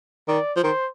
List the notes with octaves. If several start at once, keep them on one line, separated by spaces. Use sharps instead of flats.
D#3 D5
F3
D#3 C5